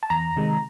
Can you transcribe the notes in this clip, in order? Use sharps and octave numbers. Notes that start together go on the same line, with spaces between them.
A5
E2 A#5
C3 D#3 G#3